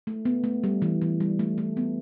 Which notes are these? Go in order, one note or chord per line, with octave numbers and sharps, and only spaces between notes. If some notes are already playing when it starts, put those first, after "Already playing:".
A3
B3
A3
G3
E3
E3
G3
A3
A3
B3